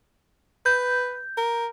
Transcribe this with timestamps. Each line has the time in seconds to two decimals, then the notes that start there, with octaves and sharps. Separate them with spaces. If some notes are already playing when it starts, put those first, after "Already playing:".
0.66 B4 G6
1.37 A#4